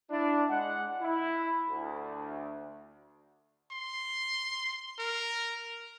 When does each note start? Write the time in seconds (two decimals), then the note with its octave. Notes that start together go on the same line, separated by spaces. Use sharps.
0.10 D4 E4
0.50 G#3 F#5
1.01 E4
1.69 D2
3.72 C6
4.99 A#4